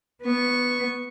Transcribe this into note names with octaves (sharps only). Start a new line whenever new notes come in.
B3 C#6